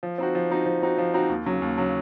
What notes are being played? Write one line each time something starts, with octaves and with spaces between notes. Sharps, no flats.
F3
C4 D#4 F#4
F3
C4 D#4 F#4
F3
C4 D#4 F#4
F3
C4 D#4 F#4
D#2
C#3 F#3
D#2
C#3 F#3